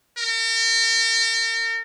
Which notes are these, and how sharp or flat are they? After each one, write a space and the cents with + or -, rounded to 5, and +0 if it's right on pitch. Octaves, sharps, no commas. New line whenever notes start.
A#4 -40